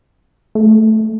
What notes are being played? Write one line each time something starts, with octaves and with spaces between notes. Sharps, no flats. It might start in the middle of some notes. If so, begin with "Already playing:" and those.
A3